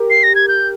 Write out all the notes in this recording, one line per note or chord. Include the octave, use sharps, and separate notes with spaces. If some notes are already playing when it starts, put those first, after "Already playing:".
Already playing: G4 A#4
C7
A#6
G#6
G6